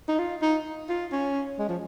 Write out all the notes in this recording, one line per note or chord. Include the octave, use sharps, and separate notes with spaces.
D#4
F4
D#4
F4
C#4
G#3
F3